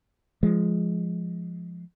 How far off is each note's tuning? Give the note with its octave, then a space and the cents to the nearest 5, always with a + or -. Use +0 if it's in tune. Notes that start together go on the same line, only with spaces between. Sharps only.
F3 -10 G#3 +0